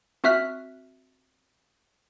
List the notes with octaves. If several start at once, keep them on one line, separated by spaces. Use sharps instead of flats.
C4 F#4 E5 F6 F#6 B6